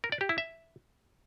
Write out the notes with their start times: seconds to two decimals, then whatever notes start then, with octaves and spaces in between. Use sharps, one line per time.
0.04 A#4
0.12 D5
0.21 G4
0.29 E4
0.38 E5